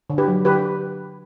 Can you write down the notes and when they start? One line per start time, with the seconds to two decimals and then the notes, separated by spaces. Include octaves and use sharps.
0.10 D3
0.18 G4 B4
0.28 F#3
0.45 D3 G4 B4